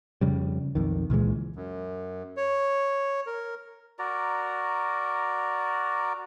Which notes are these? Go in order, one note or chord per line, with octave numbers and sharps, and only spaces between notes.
F2 C#3 G3
B1 F2 D#3
C#2 A#2 E3 G#3
F#2
C#5
A#4
F#4 A#4 D5 A#5